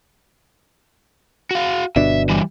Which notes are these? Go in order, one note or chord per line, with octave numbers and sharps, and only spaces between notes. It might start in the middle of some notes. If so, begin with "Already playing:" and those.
F#4 F5
G1 B2 D4 E5
E3 G3